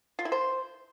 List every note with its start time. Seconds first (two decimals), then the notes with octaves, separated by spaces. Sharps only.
0.19 F4
0.25 E4
0.32 C5